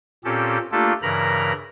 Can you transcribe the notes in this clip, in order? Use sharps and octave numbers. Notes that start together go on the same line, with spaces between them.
A#2 C4 C#4 G4 A4
A3 A#3 D4 F4 G4 A4
G2 C#3 E3 A#4 A#5 B5